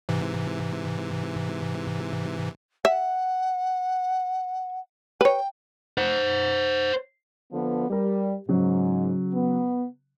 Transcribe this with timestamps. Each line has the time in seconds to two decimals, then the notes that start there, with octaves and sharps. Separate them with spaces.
0.09 G#2 C3 E3
2.85 E5 F#5
5.21 B4 C#5 G5
5.98 C5 F#5
7.53 D3 F3 B3
7.90 G3 G4 A#4
8.49 G#2 C#3 F#3
9.33 B3